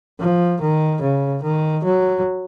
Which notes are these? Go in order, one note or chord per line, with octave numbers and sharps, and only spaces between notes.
F3
D#3
C#3
D#3
F#3